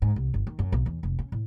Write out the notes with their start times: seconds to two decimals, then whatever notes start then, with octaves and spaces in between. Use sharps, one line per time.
0.02 G#2
0.16 C2
0.34 G1
0.47 D#3
0.59 F#2
0.72 B1
0.86 E2
1.03 F1
1.19 C#4
1.32 A2